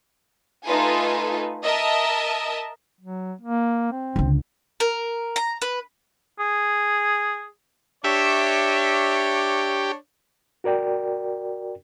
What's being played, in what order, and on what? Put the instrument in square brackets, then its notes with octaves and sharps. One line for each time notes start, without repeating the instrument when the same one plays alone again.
[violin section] A3 D#4 F4 A4 B4 G#5
A#4 D#5 E5 A5
[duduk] F#3
A#3
C4
[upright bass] C#2 D3
[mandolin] A#4
A#5
B4
[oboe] G#4
[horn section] D4 C#5 [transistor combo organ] G4 [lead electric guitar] E5
[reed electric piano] F#4 A#4 D5 G5